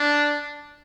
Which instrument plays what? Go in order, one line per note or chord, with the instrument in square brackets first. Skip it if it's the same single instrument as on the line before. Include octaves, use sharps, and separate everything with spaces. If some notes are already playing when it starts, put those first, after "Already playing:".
Already playing: [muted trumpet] D4